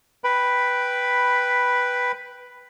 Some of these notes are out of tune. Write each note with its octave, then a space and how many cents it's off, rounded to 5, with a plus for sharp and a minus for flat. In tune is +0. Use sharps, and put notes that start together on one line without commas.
B4 +0 G5 +0 B5 +0